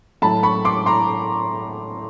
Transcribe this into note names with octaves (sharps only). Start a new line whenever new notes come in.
A2 F#3 A3 A5 B5
B5 C#6
C6 D6
A#5 C6